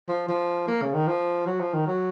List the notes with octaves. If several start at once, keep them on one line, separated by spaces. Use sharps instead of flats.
F3
F3
A#3
C#3
D#3
F3
F#3
F3
D#3
F#3